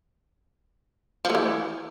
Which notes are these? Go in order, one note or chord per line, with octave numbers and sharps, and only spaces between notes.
F3
A3
E3